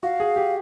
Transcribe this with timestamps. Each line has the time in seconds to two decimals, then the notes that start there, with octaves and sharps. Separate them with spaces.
0.03 F#4 F5
0.20 G#4
0.36 G4